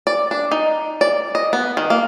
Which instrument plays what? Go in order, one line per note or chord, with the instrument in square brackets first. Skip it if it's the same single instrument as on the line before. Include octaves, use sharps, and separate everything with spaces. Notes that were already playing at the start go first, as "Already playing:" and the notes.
[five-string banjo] D5
D4
D#4
D5
D#5
B3
D#3
A#3